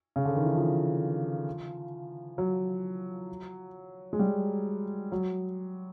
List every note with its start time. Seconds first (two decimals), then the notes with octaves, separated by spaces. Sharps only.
0.16 C#3
0.25 D3
0.36 D#3
0.46 E3
0.55 F3
2.38 F#3
4.13 G#3
4.19 G3
5.12 F#3